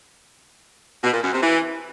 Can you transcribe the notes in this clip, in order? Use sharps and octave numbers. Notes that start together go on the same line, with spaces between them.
B2
A#2
F#2
C3
E3